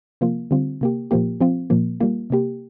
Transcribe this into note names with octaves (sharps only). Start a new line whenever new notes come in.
C3 F3 A#3 F4
D3 G3 C4 F4
C3 A#3 G4
A#2 F3 A#3 G4
F3 C4 F4
A#2 F3 A#3
G3 A#3 F4
C3 A#3 G4